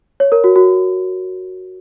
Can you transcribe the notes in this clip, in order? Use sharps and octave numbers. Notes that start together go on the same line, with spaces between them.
C#5
A#4
F#4
F#4